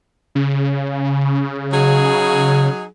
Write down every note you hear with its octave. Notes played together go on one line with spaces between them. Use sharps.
C#3
F#3 D#4 G#4